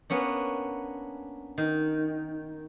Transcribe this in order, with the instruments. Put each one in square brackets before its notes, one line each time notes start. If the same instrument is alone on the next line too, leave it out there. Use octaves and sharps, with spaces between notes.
[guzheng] A#3 B3 C#4 D4
D#3